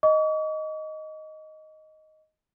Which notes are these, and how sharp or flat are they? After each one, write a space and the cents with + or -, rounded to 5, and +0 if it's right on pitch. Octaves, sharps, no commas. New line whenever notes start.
D#5 +0 C#6 +45